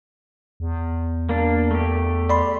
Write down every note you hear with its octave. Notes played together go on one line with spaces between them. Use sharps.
E2
A#3 D4
A3 G4
D5 B5 C6